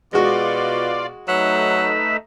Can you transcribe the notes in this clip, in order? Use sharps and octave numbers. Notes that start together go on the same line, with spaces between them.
B2 G#3 F4 F#4 D5
F#3 A3 D#4 B4 E5